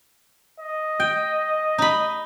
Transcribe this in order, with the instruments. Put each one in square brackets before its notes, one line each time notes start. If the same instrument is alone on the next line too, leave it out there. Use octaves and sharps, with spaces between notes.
[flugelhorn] D#5
[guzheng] G5
D#4 B5